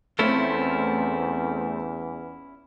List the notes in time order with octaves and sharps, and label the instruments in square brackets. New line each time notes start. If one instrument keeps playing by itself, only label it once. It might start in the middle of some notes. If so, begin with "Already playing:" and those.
[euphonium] E2 [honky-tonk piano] A3 C4 [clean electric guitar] C#4 E4 F4